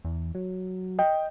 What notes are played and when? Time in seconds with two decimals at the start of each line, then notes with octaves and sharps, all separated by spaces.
0.05 E2
0.35 F#3
0.99 D#5 G5